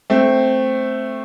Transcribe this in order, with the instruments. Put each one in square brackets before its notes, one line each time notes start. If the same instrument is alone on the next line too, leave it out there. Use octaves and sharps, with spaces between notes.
[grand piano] A3 C4